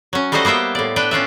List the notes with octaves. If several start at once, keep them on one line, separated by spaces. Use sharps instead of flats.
F#3 C#4
G3 A3 D#4 F#4 C5 D#5
A#3 B3 C5 E5 G5
A2 D5
D4 B4 G5
C#4 F4 D5 E5